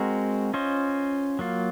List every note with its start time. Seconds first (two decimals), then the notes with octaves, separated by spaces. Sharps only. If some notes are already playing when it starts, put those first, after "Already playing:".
Already playing: G#3 C4 F#4 A#4
0.54 C#4 F4 C5 D#5
1.39 F#3 A#3 F4